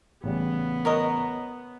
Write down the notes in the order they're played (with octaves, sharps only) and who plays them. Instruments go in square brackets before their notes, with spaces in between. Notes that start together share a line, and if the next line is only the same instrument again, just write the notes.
[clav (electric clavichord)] A1 C#3 G3 [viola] B3
[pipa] A#4 C#5 D#5